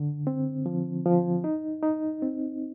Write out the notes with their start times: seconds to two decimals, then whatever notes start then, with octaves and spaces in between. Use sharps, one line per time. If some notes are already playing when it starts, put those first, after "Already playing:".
Already playing: D3
0.27 C4
0.66 F3
1.06 F3
1.44 D#4
1.83 D#4
2.22 C4